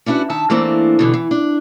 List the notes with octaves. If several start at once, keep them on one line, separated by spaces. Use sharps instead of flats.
C#4 D4 E4 F#4 B4
D#3 E5 A5
E3 A3 A#3 C4 D4
B2 D3 E3
E3
D4